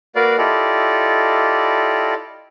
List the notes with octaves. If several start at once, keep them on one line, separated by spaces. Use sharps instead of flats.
A#3 F#4 A#4 B4 D5 F5
E4 F4 G4 A4 D5 D#5